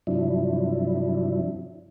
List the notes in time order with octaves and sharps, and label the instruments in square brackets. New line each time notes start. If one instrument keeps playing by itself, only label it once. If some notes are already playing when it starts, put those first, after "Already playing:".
[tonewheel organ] G2 C3 F3 F#3 D4 E4